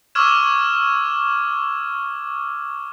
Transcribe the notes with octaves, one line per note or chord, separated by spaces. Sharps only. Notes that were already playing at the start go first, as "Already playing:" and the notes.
C#6 D6 E6 F6 G#6 E7